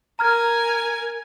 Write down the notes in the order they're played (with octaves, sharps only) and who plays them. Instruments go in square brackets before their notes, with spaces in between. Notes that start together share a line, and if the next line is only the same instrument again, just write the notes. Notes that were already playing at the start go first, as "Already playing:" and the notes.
[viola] A#4 G#5 [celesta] A#5 F6 G#6